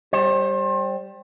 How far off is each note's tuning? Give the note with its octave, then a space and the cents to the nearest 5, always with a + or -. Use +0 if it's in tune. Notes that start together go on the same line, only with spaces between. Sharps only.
G3 +0 C5 +35